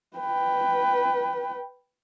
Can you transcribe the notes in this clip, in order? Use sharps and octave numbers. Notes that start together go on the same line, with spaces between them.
B4 G5